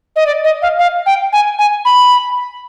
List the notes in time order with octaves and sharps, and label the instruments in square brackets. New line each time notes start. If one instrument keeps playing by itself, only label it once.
[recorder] D#5
D5
D#5
F5
F5
G5
G#5
G#5
B5